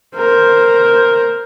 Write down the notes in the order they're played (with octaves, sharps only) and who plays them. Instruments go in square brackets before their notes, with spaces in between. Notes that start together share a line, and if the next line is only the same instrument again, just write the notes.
[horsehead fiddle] A#4 C5